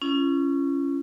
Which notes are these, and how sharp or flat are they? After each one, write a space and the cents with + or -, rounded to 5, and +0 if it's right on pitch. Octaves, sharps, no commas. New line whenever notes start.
C#4 +0 F4 -45